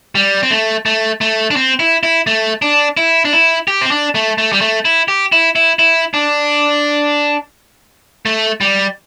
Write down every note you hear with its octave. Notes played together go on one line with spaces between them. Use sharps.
G3
C4
A3
A3
A3
D4
C4
E4
E4
A3
D4
E4
D4
E4
G4
C4
D4
A3
A3
G3
A3
E4
G4
E4
E4
E4
D4
A3
G3